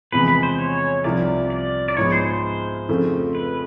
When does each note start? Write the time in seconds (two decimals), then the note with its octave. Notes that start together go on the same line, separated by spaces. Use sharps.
0.12 E2 C3 F3 G#3 B3 B4
0.28 B4
0.43 C5
0.58 C#5
1.04 C2 C3 F3 D5
1.50 D5
1.88 D5
1.97 G#2 F3 G#3 B3 C#5
2.12 C5
2.27 C5
2.89 F2 C#3 F3 A3
3.35 B4